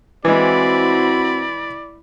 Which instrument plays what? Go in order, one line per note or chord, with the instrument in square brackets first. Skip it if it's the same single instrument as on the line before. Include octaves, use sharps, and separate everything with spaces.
[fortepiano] E3 G#3 [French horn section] C4 F#4 [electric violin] E4 B5 [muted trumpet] D5